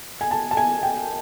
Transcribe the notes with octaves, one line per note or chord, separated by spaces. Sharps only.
G#5
A5
A5
G#5
G5